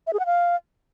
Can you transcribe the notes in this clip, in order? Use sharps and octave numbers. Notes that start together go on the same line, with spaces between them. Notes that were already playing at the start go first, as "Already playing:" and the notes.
E5
G#4
F#5
F5